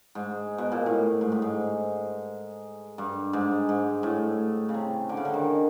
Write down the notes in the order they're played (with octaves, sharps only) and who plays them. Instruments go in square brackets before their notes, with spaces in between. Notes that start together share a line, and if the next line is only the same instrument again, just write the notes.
[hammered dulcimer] G#2
B2
A#2
A2
G#2
A2
G#2
G2
G#2
G#2
A2
C#3
C3
D3
C#3
D3
D#3